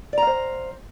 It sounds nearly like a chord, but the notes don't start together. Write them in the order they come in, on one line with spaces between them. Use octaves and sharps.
D5 A#5 F5 C5